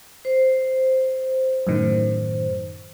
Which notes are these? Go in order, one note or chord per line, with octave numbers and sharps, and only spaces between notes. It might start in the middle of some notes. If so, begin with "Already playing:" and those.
C5
F#2 A2 D#3